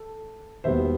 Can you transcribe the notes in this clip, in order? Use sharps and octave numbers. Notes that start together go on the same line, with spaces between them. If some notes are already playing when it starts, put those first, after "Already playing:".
Already playing: A4
E1 D#2 D#3 G3 B3 C5 E5